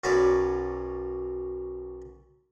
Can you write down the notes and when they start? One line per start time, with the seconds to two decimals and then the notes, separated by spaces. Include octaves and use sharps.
0.04 B1 F#2 F#3 B4 C#5 D5